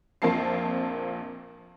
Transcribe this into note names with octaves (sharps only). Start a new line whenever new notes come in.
A#1 F2 A#3 C4 A5 C7